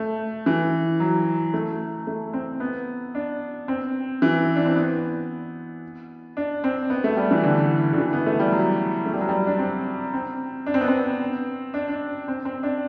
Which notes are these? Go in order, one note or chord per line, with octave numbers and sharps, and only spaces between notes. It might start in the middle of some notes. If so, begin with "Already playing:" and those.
Already playing: A3
E3
F#3
A3
A3
C4
B3
D4
C4
E3
D4
C4
B3
D4
C4
B3
A3
G3
E3
D3
D3
E3
B3
A3
G3
F#3
A3
G3
F#3
G3
D4
C4
C4
D4
C4
B3
C4
D4
D4
C4
C4
D4